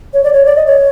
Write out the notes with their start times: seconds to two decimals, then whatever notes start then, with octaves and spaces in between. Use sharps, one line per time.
0.14 C#5
0.24 D5
0.33 C#5
0.45 D5
0.56 D#5
0.66 C#5